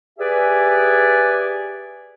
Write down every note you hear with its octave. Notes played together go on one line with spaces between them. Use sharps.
G4 G#4 B4 D5 E5 G#5